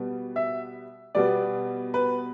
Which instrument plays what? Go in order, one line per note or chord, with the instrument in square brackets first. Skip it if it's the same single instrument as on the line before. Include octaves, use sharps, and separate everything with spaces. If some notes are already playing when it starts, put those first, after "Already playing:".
Already playing: [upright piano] B2 G3 B3
E5
B2 G3 B3 D5
B4